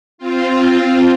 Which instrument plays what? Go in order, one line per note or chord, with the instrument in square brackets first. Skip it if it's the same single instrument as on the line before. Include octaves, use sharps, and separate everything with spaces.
[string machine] C4 F4